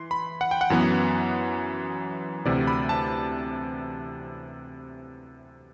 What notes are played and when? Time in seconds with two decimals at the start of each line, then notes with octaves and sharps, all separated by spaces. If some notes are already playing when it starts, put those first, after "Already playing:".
Already playing: E3 C6
0.11 B5
0.41 F#5
0.51 G5
0.61 F#5
0.70 F#2 E3 B3
2.45 D2 C3 E3 D5
2.67 B5
2.89 A5